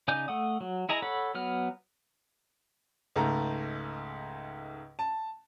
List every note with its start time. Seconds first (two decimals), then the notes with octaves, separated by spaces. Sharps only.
0.08 C#3 D#4 D5 G#5 G6
0.28 A3 F#5 D#6
0.61 F#3
0.89 E4 G#4 D#5 A#5
1.02 A4 C#5 F#5 B5
1.35 F#3 B3 F6
3.16 C#2 G#2 A3 A#5
4.99 A5